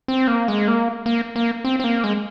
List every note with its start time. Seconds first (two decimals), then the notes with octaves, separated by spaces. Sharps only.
0.08 C4
0.27 A#3
0.48 G#3
0.68 A#3
1.06 A#3
1.36 A#3
1.65 C4
1.80 C4
1.84 A#3
2.04 G#3